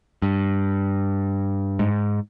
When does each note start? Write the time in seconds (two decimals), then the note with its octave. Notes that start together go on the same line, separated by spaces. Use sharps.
0.22 G2
1.79 G#2